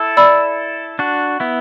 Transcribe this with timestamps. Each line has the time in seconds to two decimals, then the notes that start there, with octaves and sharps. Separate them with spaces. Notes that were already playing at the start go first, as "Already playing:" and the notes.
Already playing: E4 A4
0.17 D5 B5 E6
0.99 D4 F#4
1.40 B3 E4